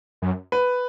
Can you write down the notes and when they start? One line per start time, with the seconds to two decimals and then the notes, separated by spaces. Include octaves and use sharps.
0.22 F#2
0.52 B4